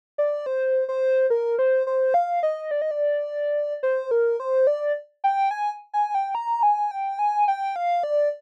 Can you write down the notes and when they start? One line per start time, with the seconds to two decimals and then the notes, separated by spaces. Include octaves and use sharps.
0.18 D5
0.46 C5
0.89 C5
1.30 A#4
1.59 C5
1.87 C5
2.14 F5
2.43 D#5
2.71 D5
2.82 D#5
2.91 D5
3.83 C5
4.11 A#4
4.40 C5
4.67 D5
5.24 G5
5.51 G#5
5.94 G#5
6.15 G5
6.35 A#5
6.63 G#5
6.91 G5
7.19 G#5
7.48 G5
7.76 F5
8.03 D5